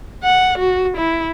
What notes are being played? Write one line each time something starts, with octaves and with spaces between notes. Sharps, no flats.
F#5
F#4
E4